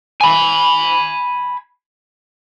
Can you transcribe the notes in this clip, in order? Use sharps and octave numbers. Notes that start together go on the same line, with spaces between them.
G#5 B5